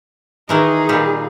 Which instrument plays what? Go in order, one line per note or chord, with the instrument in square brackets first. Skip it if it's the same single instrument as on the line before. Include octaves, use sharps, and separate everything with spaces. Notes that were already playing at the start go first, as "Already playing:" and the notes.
[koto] D#3 E3 A#4 [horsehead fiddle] D#4 G#4
[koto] A#2 G3